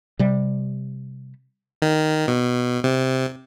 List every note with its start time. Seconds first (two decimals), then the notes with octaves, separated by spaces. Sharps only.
0.19 C3 G3
1.82 D#3
2.28 B2
2.84 C3